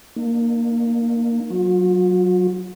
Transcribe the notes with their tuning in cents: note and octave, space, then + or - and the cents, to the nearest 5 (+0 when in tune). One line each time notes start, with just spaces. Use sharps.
A#3 +0 D#4 -40
F#3 +0 F#4 -45